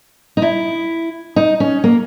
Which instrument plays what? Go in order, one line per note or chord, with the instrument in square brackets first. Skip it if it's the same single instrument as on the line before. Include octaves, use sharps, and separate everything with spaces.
[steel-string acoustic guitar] D#4
E4
D#4
C#4
A#3